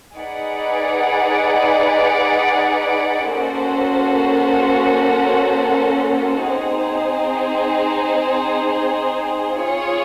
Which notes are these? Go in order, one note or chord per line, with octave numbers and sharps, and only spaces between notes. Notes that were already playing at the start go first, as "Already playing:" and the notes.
D#4 G#4 B4 D5 F#5
A#3 C#4 F#4 A4 C5
C4 D#4 G#4 C5
F4 G#4 C#5